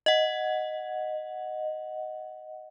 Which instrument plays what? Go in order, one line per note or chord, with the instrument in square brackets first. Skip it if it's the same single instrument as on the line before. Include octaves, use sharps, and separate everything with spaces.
[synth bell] D#5 F#5